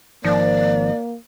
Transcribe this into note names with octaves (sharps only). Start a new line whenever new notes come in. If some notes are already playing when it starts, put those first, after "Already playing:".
G#1 D#3 F3 A#3 D5